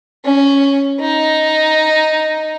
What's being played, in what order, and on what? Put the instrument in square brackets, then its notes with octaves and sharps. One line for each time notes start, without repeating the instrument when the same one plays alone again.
[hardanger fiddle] C#4
D#4